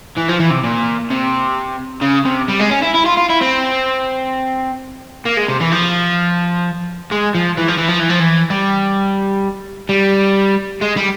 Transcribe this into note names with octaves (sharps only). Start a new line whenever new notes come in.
E3
F3
E3
C3
A#2
C3
C#3
C3
G3
G#3
C#4
E4
E4
F4
F4
E4
C4
A#3
G#3
C3
E3
F3
G#3
F3
E3
F3
E3
F3
E3
F3
E3
G3
G3
G#3
G3